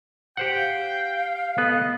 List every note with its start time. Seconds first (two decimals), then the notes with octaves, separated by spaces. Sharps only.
0.37 G4 C5 F#5 G5
0.58 F5
1.58 B3 A4 B4 D#5